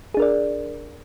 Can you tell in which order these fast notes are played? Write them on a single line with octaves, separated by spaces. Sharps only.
G#4 D4 A#4 D5